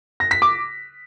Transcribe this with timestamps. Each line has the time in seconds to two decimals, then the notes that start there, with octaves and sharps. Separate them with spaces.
0.20 A#6
0.31 B6
0.42 D6